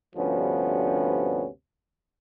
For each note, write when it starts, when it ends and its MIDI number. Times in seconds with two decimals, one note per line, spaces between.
0.16 1.46 38
0.16 1.46 43
0.16 1.46 48
0.16 1.46 53
0.16 1.46 59
0.16 1.46 61